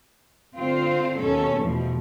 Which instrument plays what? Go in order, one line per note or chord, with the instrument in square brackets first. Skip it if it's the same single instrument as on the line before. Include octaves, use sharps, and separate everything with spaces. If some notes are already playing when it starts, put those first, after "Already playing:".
[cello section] D3 C4 F4 C5
D#2 B2 C#4 A4
E2 B2 F3 A3